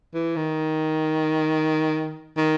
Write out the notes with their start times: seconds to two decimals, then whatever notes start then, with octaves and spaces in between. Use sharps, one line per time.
0.14 E3
0.36 D#3
2.37 D#3